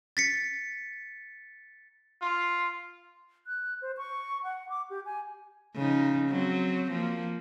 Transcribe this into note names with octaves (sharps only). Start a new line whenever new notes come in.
A6 B6 C#7
F4
F#6
C5
C#6
F#5
D6
G4
G#5
C#3 F3 D#4
F#3 C4
F3 A#3